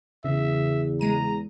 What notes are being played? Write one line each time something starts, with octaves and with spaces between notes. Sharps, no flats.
E2 C#3 E5
G#3 A#5 D#7